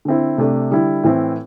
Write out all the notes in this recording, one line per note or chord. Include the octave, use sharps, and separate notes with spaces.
D3 C4 E4
C3 A3 D4
D3 G3 E4
A2 E3 C4 E4